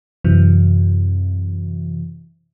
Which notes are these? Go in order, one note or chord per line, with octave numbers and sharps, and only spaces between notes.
F#2 C3 E3